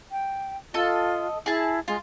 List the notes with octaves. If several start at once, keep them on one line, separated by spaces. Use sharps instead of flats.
G5
F4 A4 D#5
E4 G#4 A5
G#3 F4